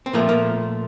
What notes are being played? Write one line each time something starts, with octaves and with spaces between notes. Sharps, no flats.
C4
A#2 F3 A3 A#3
A#3